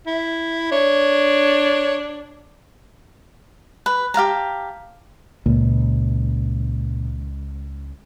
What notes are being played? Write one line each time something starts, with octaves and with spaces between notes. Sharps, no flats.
E4
D4 C#5
B4
G4 F5 A5 A#5
C#2 A#2